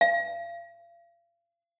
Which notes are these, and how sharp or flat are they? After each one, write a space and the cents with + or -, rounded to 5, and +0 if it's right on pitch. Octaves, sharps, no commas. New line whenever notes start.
F5 -35